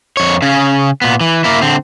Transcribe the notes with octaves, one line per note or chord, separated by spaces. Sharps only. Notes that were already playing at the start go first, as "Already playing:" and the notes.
F2 C#5
C#3 C#4
A#2 B3
E3
A#3 E4
D3 C4